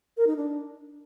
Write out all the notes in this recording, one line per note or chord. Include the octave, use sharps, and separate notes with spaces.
A#4
D#4
D4